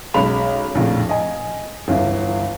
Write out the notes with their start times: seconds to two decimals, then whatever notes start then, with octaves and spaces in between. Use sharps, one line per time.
0.14 B1 G#3 C#4 B5 F7
0.75 A#1 F2 A2
1.09 D#5 G#5
1.88 G1 C#2 E3